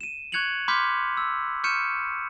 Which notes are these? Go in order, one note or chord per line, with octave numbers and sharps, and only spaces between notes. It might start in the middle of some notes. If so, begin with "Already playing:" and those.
D#7 E7
C#6 F#6 G#6 C#7 F7 F#7
B5 C6 D6 F6 G6 B6
E6
C#6 F6 G6 C#7 D#7 E7